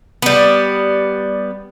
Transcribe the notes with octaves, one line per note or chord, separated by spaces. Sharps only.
G3 B3